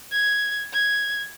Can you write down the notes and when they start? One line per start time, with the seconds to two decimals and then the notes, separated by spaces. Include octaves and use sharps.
0.12 G#6
0.73 G#6